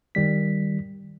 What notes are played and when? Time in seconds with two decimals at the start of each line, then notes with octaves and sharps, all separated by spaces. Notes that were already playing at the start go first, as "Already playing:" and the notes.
0.15 D#3 G3 B6